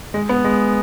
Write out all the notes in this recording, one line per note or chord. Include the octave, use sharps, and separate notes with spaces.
G#3
B3
G#3